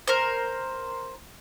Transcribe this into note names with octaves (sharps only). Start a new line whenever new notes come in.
A#4 C5